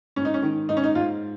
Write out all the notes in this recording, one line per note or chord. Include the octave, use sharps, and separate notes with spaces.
G#2 C#4
D#4
C#4
D#3
G#2 D#4
C#4
D#4
G#2 F4